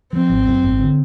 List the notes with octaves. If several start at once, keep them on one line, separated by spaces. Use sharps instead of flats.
F3 C4
G#1
F#2
G#1
D3